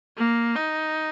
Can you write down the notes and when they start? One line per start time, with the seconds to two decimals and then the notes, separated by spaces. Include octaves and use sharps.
0.18 A#3
0.56 D#4